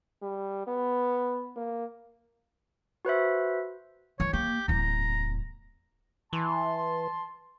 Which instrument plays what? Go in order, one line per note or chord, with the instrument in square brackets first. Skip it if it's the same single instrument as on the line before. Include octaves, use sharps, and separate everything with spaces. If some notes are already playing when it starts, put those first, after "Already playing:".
[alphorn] G3
B3
A#3
[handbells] F#4 B4 C5 E5
[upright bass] E3 [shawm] C#5
[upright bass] A#3 [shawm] G4
[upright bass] D1 E2 [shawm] A#5
[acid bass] E3 [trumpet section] A5 C6